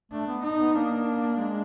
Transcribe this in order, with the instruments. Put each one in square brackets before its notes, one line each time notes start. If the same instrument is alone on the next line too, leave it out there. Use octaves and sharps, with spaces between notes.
[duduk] A3 [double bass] D4
[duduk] B3
[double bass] D#4
[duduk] B3
[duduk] A#3 [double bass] D4
[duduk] G#3